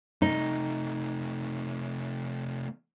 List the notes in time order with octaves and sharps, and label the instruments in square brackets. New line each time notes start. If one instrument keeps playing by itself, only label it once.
[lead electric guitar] C3 A3 [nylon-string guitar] D#4